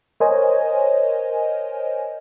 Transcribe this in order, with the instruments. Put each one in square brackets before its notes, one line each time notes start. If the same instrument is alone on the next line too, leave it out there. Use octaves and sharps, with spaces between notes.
[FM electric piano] A#4 C5 C#5 D#5 G#5